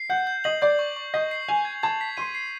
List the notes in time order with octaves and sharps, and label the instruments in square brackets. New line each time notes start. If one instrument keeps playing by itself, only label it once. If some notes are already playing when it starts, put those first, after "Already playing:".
Already playing: [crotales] C7
[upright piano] F#5 [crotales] G6
[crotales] G6
[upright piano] D#5 [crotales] F#7
[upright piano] D5 [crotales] G6
[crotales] C#6
C#6
[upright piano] D#5 [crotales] G6
[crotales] C7
[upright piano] G#5 [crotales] F7
[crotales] G#6
[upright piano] A5 [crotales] G#6
[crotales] B6
[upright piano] C6 [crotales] D#7
[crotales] C7